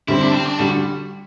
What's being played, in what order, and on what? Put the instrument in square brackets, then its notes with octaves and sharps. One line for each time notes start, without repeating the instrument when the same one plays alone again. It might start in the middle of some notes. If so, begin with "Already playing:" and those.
[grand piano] D3 G3 C4 [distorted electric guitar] E4
[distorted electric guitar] D4
C4
D4
[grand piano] D3 G3 [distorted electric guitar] F#4